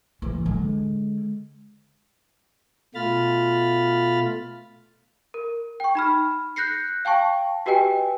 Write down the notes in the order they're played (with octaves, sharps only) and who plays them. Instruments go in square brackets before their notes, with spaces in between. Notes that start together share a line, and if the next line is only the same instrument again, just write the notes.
[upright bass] A2 E3
D3 G#3
[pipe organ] B2 A3 F4 B5 F6 A6
[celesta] A#4
G5 C#6
D#4 B5 F6
F#6 G6 A#6 C7 C#7
F5 G5 A5 C#6
F#4 G4 B4 D#5 G5 G#5